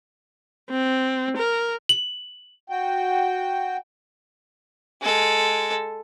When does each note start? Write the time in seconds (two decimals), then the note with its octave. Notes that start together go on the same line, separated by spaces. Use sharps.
0.71 C4
1.37 A#4
1.89 F#7
2.70 F#4 G5
5.02 G#3 A4